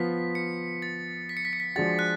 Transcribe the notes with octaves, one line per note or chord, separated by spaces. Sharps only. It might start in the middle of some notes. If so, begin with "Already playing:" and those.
Already playing: F3 B3 F4 B6
C#7
A6
B6
C#7
B6
C#7
B6
F3 G#3 D4 F#4 A6
F#6